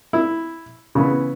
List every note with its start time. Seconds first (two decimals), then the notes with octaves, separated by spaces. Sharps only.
0.13 E4
0.95 C#3 E3 B3